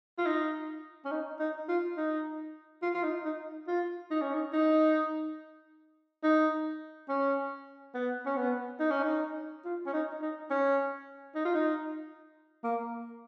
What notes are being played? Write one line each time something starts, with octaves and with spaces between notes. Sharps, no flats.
F4
D#4
C#4
D#4
D#4
F4
D#4
F4
F4
D#4
D#4
F4
D#4
C#4
D#4
D#4
D#4
C#4
B3
C#4
B3
D#4
C#4
D#4
F4
C#4
D#4
D#4
C#4
D#4
F4
D#4
A#3